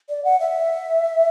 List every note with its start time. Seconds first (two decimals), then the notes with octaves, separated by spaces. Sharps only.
0.09 D5
0.25 F#5
0.40 E5